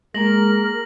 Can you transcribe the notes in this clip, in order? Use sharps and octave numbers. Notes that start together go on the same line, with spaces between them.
G#3 A#3 G#4 A#4 A#5 A#6 F#7